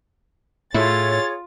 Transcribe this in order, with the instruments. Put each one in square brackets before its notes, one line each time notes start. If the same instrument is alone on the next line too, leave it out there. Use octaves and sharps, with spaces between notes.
[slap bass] A2 [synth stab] A3 E4 [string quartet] F4 A6 [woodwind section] G#4 C#5